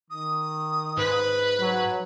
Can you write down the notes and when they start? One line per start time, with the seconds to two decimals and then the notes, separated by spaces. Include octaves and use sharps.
0.10 D#3 D#6
0.97 G#2 B4
1.60 F#3 C#5